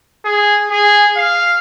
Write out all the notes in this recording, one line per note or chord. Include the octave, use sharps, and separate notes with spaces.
G#4
G#4
F5